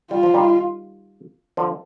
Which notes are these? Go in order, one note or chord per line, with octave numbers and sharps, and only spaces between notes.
G3 F4
F3
D#3 G3
D3 F3